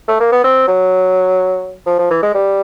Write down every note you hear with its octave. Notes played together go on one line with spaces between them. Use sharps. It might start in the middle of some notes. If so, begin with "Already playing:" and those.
A3
A#3
B3
C4
F#3
F3
F3
E3
G#3
G3